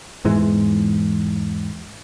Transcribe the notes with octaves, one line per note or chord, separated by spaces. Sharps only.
E2 G#2 E3 G#3